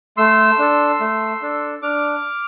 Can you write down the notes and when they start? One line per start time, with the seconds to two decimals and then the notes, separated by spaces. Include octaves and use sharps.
0.17 A3 C6 E6
0.59 D4 A4
1.00 A3
1.42 D4 A4
1.82 D4 D6 F6